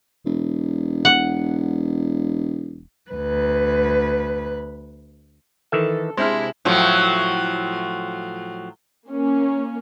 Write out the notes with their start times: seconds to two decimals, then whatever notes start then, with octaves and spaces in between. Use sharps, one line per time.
0.25 E1
1.05 F#5
3.11 D2 B4
5.72 D#3 E3 A4 E5
6.17 C3 G#3 D4 E4 C5 F6
6.65 A2 F3 F#3
9.10 A#3 C#4